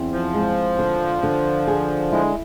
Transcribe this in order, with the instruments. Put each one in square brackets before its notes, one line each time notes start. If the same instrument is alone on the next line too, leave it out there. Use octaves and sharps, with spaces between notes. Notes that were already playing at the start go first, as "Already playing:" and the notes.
Already playing: [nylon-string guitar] E2 C4
[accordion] F3
[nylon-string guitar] G#3
D3
D3
G#4
[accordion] G#3 [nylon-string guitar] E4